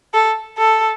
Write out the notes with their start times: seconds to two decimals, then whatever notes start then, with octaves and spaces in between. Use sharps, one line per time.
0.14 A4
0.58 A4